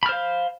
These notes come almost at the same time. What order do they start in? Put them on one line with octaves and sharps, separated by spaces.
B5 F6 C5 F5